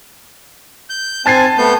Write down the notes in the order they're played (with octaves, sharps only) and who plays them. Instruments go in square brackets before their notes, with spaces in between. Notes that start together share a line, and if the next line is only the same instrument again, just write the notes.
[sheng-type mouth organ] G6
[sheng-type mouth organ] C4 G#5 [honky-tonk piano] A5 A6 C7
[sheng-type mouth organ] A3 B3 G6